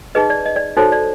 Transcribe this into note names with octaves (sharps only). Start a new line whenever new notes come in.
D#4 G#4 B4 D#5
D5
D#5
D5
D#4 F#4 A4 C5 C#5
D5